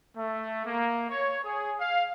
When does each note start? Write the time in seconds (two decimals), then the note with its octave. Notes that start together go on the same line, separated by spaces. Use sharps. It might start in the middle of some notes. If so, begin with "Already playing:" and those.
0.16 A3
0.66 A#3
1.09 C#5
1.44 G#4
1.80 F5